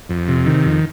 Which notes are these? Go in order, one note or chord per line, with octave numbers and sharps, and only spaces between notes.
F2
C3
D#3
F2